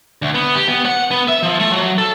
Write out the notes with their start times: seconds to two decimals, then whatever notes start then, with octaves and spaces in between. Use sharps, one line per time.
0.22 D2
0.34 B3
0.55 G4
0.68 B3
0.86 F#5
1.11 B3
1.28 E5
1.43 F3
1.59 A3
1.72 F#3
1.98 A4